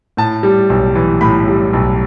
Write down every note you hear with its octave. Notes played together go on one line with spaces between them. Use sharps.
A2 A5
G3
B1
E3
A2 B5
G3
B1